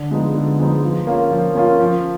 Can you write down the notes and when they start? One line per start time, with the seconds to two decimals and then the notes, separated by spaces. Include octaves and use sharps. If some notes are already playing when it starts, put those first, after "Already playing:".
Already playing: D3
0.11 F3 G#3 B3 D#4
0.34 D3
0.59 F3 G#3 B3 D#4
0.83 F3
1.07 A#3 C#4 F4
1.31 F3
1.55 A#3 C#4 F4
1.80 F3